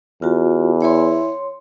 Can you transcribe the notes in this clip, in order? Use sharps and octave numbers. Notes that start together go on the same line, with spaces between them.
E2 F4 F#4
E4 C#5 C6